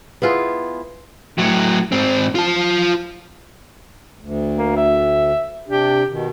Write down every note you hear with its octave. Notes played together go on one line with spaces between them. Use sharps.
B3 E4 F4 G#4
A2 F#3
G#2 C4
F4 A5
D2
A#3
E5
C3 D4 G4
B2 D#3